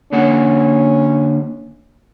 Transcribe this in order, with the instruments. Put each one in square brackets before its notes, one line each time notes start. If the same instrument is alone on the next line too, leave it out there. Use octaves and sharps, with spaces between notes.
[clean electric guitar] D3 A#3 F#5 [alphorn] C#4